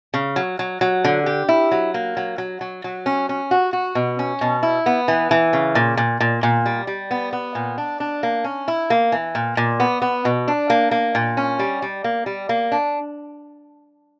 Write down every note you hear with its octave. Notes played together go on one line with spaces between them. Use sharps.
C#3
F#3
F#3
F#3
D3
G4
E4
F#3
A#3
F#3
F#3
F#3
F#3
C#4
C#4
F#4
F#4
B2
C#4
B2
E4
B3
E3
E3
C#3
A#2
A#2
A#2
A#2
G3
G3
B3
B3
A#2
D4
D4
A#3
C#4
E4
A#3
E3
A#2
A#2
B3
B3
B2
D4
A#3
A#3
A#2
C#4
G3
G3
A#3
G3
A#3
D4